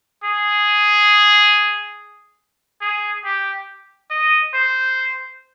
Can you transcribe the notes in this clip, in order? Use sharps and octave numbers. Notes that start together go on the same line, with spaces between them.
G#4
G#4
G4
D#5
C5